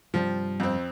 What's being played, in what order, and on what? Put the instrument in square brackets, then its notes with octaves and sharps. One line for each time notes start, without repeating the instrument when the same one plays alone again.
[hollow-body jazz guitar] G2 C3 G3 [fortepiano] F3
[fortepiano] F2 C4